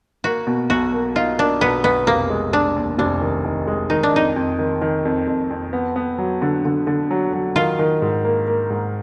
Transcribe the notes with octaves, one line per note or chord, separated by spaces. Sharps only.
A#3 F#4
B2
B1 F#4
A#3
D#4 F4
A#3 D4
B1 B3
B1 B3
F1 A#3
G#3
G#3 D4
D#2
F1 D4
D#3
D#3
G#3
D#3 D#4
D4
F2 D#4
F2
D#3
D#3
F2
F2
F2
B3
B3
F#3
D3
D3
D3
F#3
F#3
D#3 F4
D#3
G#2
A#3
A#3
G#2